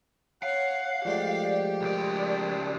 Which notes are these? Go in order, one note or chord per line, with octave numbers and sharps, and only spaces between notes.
C#5 F5 F#5
F3 G#3 A3 G4 D5
C#2 A#4 D5